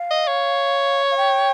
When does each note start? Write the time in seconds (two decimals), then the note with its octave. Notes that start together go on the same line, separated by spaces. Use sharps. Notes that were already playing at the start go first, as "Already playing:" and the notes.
Already playing: F5
0.10 D#5
0.27 C#5
1.11 F5
1.17 G5